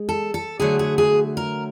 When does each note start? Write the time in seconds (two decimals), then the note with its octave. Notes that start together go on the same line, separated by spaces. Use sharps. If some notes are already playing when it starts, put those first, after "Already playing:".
Already playing: G#3
0.09 A4
0.34 A4
0.60 D3 F#3 A3 G#4
0.79 G#4
0.98 G#4
1.37 A#4